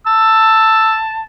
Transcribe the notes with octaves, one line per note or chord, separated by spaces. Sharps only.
A5 E6